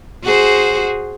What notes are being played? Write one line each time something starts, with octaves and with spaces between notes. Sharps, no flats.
F#4 G#4 C5